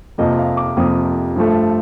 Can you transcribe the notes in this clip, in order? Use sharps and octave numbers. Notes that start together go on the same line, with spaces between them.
F2 C3 F3 A#3 D#5
F5
D6
F2 C3 F3 A#3 D#6
G2 F3 A3